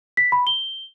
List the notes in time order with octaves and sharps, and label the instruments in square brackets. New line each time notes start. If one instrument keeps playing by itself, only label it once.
[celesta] B6
B5
G7